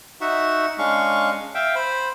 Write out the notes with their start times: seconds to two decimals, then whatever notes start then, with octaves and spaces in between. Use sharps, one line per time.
0.21 D#4 F#4 E5 F#5
0.78 G#3 C#4 D4 F5 C#6
1.54 E5 F5 G5
1.75 C5 B5